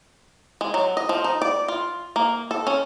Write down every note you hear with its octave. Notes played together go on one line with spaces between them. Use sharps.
G#3
F#3
D#5
F3
D#4
D5
F4
A#3
A4
C#4